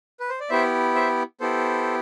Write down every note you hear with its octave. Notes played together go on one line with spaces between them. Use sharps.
B4
C5
D5
B3 E4 G4 C5 E5
C5 E5
B3 E4 G4 A4 C5